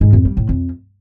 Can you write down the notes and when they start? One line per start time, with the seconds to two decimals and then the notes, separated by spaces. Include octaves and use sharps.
0.01 G#2
0.13 F2
0.25 G3
0.37 A2
0.49 F2